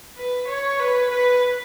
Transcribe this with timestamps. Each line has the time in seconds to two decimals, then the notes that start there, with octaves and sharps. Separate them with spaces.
0.18 B4
0.47 C#5
0.80 B4
1.11 B4